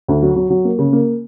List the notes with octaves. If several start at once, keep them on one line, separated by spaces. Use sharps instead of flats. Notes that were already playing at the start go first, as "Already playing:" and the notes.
D2
F#3
F#3
F#3
A#3
C#3
A#3